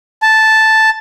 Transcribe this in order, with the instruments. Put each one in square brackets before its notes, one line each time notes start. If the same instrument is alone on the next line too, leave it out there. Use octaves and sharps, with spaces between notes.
[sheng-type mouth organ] A5